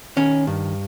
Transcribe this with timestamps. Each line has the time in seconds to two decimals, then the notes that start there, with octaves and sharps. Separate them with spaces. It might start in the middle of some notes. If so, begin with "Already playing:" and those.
0.17 D#3 C#4
0.47 G2